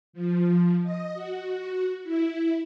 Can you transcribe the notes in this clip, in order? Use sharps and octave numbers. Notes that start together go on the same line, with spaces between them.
F3
D#5
F#4
E4